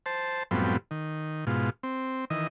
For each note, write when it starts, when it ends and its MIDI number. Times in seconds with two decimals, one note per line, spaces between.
0.06 0.43 72
0.06 0.43 81
0.51 0.77 42
0.51 0.77 45
0.51 0.77 53
0.51 0.77 55
0.51 0.77 59
0.51 0.77 60
0.91 1.45 51
1.47 1.70 44
1.47 1.70 47
1.47 1.70 65
1.83 2.25 60
2.30 2.47 51
2.30 2.47 52
2.30 2.47 75